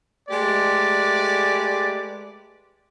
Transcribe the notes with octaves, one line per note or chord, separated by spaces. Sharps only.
G#3 A3 G4 B4 D5